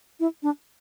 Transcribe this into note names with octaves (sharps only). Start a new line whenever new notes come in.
E4
D4